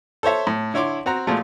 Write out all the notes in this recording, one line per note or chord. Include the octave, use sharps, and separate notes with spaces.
A4 C5 C#5 E5
A2
D3 E4 C#5 C6 D6
C4 F#4 F#5 A#5
A#2 F3 G#3 A3